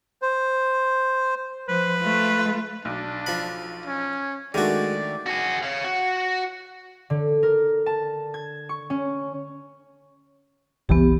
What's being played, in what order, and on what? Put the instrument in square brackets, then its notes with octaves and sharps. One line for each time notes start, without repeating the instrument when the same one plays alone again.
[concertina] C5
[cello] F3 C5 [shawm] B4
[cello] A3 F4
[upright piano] B1 [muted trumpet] D4
[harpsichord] F3 B5
[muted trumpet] C#4
[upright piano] D#3 A3 D4 [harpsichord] G#3 F#4 [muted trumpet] D5
[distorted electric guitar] F#4 G#4
C#5 F5
F#4
[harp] D3
A#4
A5
G#6
C#6
C#4
[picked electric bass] F#1 C2 E3 [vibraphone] B3 G4